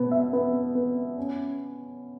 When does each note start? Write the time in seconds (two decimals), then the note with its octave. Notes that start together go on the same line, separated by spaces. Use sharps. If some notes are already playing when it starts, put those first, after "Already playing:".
Already playing: B2 B3
0.11 E5
0.33 B3
0.75 B3
1.17 C#4